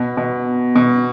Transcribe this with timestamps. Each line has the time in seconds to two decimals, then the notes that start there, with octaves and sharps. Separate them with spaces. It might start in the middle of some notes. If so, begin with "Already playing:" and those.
Already playing: B2
0.17 B2
0.76 B2